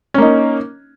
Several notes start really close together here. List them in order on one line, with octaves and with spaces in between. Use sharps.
C#4 A#3 D#4